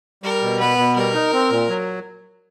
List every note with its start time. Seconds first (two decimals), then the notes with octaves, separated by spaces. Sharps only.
0.23 G3 A#4
0.42 B2
0.59 B3 B4
0.78 B2
0.96 G3 A#4
1.14 D#4
1.33 C4
1.51 A#2
1.69 F#3